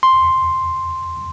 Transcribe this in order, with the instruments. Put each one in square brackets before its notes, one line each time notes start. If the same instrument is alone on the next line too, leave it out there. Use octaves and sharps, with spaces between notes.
[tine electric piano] C6